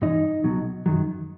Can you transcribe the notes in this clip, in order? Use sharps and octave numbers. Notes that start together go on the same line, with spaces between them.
G2 E3 D#4 D#5
C#2 B2 F#3
F#2 D#3 F#3